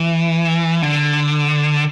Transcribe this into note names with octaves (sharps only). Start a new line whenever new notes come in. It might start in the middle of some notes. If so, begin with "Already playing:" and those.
Already playing: E3
D3